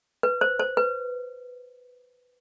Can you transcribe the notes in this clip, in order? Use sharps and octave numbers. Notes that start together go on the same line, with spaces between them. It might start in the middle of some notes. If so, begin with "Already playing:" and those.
B4
C5
C5
B4